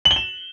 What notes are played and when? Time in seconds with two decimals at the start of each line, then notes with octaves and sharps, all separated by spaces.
0.05 F#7
0.11 G7
0.16 E7